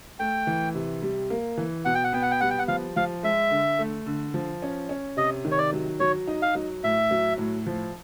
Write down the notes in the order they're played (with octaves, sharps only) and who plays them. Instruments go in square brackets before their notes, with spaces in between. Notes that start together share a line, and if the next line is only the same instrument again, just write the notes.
[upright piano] A3 [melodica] G5
[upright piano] E3
C3
G3
A#3
E3
[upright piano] B2 [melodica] F#5
[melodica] G5
F#5
[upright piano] B3 [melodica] G5
[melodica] F#5
G5
[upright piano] G3 [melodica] F#5
[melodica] G5
F#5
[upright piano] F3 [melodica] F5
[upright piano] F3 [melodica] F5
[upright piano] G#3 [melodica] E5
[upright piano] D3
A3
D3
F3
C#4
C#4
[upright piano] C3 [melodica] D#5
[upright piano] D#3
[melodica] C#5
D5
[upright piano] F#3
[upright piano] F#3 [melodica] C#5
[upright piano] D#4
[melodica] F5
[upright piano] F#3
[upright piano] A2 [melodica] E5
[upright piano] F#3
A2
F3